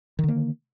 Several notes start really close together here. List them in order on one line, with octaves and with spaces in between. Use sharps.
D#3 D3 A#3